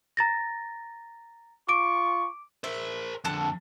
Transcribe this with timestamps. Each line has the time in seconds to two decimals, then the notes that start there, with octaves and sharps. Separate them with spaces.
0.17 A#5 A6 A#6
1.69 F4 C#6 D6 D7
2.64 A#4 C5 E5
3.25 F2 D3 A4 A5 F#6